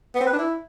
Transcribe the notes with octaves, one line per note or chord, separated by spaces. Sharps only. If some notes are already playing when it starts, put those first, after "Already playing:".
B3
C4
B4
D4
E4